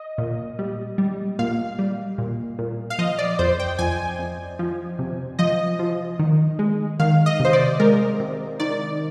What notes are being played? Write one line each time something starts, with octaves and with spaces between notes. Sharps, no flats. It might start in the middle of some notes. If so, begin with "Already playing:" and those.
Already playing: D#5
A#2
G3
G3
A#2 F5
G3
A#2
A#2
F5
F3 D#5
D5
F2 C5
G5
F2 G#5
F2
F3
C3
F3 D#5
F3
D#3
G#3
D#3 F5
D#5
C3 C5
D5
G#3 A#4
C3
D#3 D5